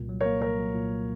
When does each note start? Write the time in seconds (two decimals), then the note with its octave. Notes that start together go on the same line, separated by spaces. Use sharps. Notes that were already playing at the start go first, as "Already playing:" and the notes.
Already playing: C2 A#2
0.09 F#3
0.21 A#4 C#5
0.26 A#3
0.41 C2 A#4 C#5
0.59 F#3
0.74 A#2